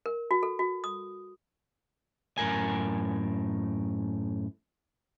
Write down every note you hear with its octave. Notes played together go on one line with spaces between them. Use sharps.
A#4
F#4
A4
F#4
D#6
F#2 A2 A#4 G#5